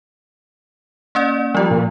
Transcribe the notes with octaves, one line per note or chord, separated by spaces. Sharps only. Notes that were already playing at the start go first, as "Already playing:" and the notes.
A#3 C#4 D5
F3 G3 F4
A#2